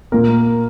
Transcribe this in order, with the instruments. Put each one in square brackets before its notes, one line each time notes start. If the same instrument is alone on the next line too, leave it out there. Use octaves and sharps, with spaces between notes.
[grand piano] A#2 A#3 A#4